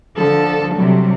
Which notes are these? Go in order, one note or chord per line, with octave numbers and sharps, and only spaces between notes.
D3 F3 A4
C3 F#3 G3